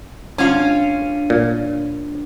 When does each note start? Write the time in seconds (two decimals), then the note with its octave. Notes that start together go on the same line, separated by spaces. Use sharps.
0.38 G#1 C#4 D4 F4
1.30 A#2